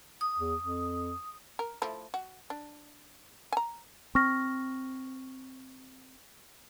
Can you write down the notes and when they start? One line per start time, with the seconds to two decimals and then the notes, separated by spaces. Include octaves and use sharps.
0.21 D#6
0.39 E2
0.61 F2
1.59 A#4
1.82 F3 A3 E4
2.14 F#4
2.50 D4
3.52 G#5 A#5
4.15 C4 C#6 F6 A#6